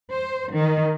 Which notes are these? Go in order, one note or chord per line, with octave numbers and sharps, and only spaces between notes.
C5
D#3